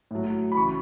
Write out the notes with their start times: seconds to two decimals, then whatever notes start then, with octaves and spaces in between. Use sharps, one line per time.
0.11 A2 F#3
0.52 B5
0.56 C#3 E3 C#6